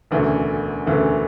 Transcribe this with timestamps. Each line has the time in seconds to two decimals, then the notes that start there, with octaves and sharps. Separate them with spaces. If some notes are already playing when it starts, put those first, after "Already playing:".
0.11 E1 D2 C#3 E3 A3
0.86 E1 D2 C#3 E3 A3